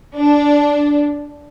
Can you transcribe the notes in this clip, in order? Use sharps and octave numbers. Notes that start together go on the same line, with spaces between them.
D4